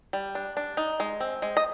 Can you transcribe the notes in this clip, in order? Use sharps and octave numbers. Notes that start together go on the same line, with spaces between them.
G3
D4
D4
D#4
G#3
C4
G#3
D#5